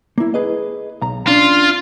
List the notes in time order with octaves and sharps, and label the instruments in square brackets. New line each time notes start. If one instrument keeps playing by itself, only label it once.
[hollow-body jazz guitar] A#3 E4
G#4 B4 D#5
B1 A#5
[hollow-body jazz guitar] C#4 D4 [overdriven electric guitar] F4